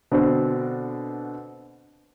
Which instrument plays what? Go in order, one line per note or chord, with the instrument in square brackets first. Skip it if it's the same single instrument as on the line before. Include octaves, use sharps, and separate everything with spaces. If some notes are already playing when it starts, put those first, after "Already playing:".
[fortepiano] B2 D3 C4